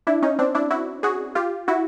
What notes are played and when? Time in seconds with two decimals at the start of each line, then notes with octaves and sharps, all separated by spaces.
0.07 D4 E4
0.22 C#4 D#4
0.39 C4 D4
0.55 D4 E4
0.71 E4 F#4
1.03 F#4 G#4
1.35 F4 G4
1.68 E4 F#4